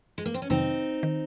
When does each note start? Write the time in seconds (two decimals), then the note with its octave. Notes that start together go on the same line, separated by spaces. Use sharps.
0.18 G#3
0.25 A#3
0.34 C4
0.42 C#4
0.50 F2 C3 D#3 F#3 C4 D#4
1.03 D#3